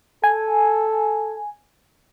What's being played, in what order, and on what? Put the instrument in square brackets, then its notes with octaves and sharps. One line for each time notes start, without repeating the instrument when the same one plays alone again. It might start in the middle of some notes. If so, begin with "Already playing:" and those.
[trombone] A4 [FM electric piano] G#5